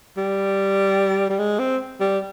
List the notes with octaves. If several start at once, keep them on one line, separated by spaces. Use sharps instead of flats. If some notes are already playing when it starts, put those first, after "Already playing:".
G3
G3
G#3
C4
G3